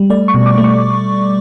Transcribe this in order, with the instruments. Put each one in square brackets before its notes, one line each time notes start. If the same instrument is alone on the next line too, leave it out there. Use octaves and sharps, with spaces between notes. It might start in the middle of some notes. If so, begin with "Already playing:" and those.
Already playing: [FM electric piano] G3
A3 D5
C#6
B2
D6
A3
C#6